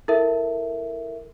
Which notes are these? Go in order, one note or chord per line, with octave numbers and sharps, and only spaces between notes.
E4 A4 A#4 E5